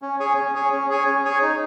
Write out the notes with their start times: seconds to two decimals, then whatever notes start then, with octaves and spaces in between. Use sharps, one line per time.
0.02 C#4
0.20 G#4 C#5 G#5
0.37 C#4
0.55 G#4 C#5 G#5
0.72 C#4
0.90 G#4 C#5 G#5
1.07 C#4
1.25 G#4 C#5 G#5
1.42 D#4